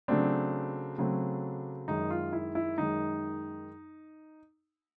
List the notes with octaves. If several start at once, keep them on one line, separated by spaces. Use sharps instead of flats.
C#3 F#3 A3 C4 D4
C#3 F#3 A3 C4
F#2 D#3 G#3 D#4
F4
E4
E4
F#2 D#3 G#3 D#4